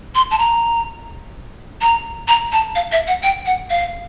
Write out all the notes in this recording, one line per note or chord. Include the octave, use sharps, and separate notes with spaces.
C6
A5
A#5
A#5
A#5
A5
F5
E5
F#5
G5
F#5
F5